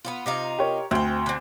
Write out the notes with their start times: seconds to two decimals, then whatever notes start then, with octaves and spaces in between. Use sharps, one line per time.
0.05 B3 C#4 F4
0.26 C3 D#4 F4
0.59 G4 A#4 C#5
0.91 D2 C4 G5
1.26 D3 C4